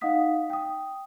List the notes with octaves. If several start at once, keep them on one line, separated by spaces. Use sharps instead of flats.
D#4 D#5 F5 F#5 D#6 B6
G5 D#6